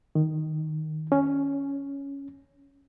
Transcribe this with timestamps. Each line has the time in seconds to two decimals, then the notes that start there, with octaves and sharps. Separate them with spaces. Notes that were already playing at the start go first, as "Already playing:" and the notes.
0.15 D#3
1.12 C#4